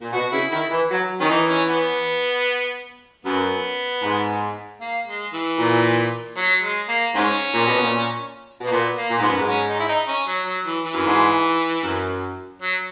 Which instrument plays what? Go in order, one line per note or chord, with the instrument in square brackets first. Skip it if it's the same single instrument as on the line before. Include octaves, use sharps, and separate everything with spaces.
[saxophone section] A#2
[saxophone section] B2 [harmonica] F#4
[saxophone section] C#3 [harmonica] E4
[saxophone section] D#3 [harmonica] E4
[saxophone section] E3
F#3
[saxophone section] D#3 [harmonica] C#4
[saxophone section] E3 [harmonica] D#4
[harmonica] C#4
B3
[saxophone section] F#2 [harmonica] B3
[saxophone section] G#2
[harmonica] A#3
G#3
E3
[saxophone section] A#2
[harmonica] F#3
G#3
A#3
[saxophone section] G#2 [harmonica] C#4
[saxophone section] A#2
B2
A#2
B2
[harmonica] A#3
[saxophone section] A#2 [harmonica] B3
[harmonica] A#3
[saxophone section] A#2
[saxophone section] G#2 [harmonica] B3
[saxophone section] F#2
G#2
[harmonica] C#4
D#4
E4
D#4
C#4
F#3
F#3
E3
E3
[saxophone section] F#2
G#2
F#2
[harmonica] F#3